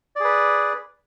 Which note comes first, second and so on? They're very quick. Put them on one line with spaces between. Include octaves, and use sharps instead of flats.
D5 G#4 B4